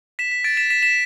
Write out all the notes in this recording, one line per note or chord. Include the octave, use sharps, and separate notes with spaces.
B6 E7
B6
A6 D7
B6 E7
B6 E7
B6 E7